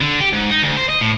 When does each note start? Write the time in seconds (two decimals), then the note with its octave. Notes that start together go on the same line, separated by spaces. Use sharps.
0.01 D3
0.21 G4
0.33 G#2
0.50 D#4
0.62 D2
0.77 C5
0.89 D#5
1.01 A2